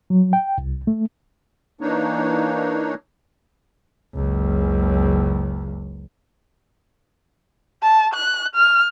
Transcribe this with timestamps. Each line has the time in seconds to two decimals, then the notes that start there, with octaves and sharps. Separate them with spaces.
0.10 F#3
0.33 G5
0.58 C2
0.87 A3
1.81 E3 A#3 D4 D#4 C#5
4.15 F#1 C#2
7.82 A5
8.14 F#6
8.55 F6